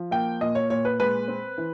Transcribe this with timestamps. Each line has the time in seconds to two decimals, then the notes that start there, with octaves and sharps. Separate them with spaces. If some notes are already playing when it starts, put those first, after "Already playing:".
Already playing: F3
0.11 A#3 G5
0.41 A#2 D#5
0.55 C#5
0.70 A#2 C#5
0.85 B4
1.00 G#3 B4
1.28 C4
1.58 E3